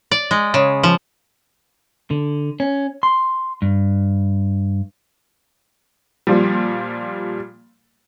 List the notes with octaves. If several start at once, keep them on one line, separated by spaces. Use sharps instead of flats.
D5
G#3
C#3
F3
D3
C#4
C6
G2
A#2 F3 G3